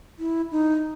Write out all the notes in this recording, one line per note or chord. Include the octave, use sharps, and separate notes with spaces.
E4
D#4